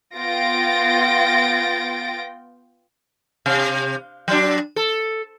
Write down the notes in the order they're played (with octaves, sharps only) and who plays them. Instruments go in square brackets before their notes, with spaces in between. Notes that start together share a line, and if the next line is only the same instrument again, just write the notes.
[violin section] B3 F4 G5 A6 A#6 D7
[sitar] C3
F#3 D4
A4